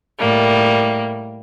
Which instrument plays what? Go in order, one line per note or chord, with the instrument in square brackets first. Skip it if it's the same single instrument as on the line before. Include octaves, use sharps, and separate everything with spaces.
[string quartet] A2 G3 A#3